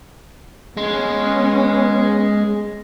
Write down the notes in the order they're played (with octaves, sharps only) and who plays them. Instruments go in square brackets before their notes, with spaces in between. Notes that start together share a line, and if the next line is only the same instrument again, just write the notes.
[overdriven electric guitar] G#3 [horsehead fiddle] B3 C#4